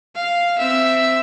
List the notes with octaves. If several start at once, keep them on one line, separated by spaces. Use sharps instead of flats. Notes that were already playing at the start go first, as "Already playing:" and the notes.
F5
C4 E5